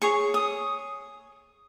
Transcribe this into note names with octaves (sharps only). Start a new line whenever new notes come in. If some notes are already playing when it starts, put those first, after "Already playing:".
G#4 C#5 C#6
D#6